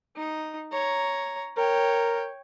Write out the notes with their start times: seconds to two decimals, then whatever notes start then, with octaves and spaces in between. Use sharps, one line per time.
0.16 D#4
0.72 C#5 A#5
1.57 A#4 C#5 G5